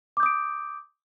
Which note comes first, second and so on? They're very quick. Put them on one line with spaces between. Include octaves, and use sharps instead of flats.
D6 G6 D#6 D7